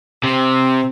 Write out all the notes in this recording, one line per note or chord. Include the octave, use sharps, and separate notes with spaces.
C3 C4